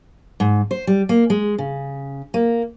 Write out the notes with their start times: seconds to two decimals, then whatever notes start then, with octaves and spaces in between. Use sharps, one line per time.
0.40 G#2
0.71 C5
0.87 G3
1.09 A#3
1.30 G#3
1.58 C#3
2.34 A#3